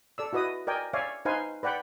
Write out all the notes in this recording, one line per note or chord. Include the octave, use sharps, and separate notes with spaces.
A4 D5 E6
E4 F#4 B4 D#5 D#6
A#4 D5 D#5 G5 G#5
C#5 D5 E5 F5 G#5
D#4 B4 C5 F5 G#5
B4 D5 F#5 G5 B5